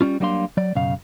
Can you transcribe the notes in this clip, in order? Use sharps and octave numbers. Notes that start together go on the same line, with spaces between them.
G3 C#4 F4
F#3 G3 A#3 D4 F5 C6
F#3 D5
B1 F#2 C#3 F5